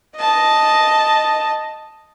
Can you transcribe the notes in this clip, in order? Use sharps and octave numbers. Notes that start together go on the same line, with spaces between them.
D#5 A5